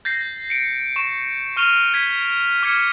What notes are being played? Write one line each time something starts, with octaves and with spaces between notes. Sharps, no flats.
G6 A6 A#6 C7
C#7 D7
C#6 E7
C#6 F6 D#7 F7 G7
G#6 B6
D6 F6 G#6 C#7